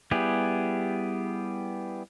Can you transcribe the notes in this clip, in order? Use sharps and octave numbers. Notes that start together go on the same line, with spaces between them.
G3 B3 E4 G4 G#4